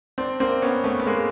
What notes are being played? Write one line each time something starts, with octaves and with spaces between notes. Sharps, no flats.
C4 D4
A#3 C4
B3 C#4
A3 B3
B3
G#3 A#3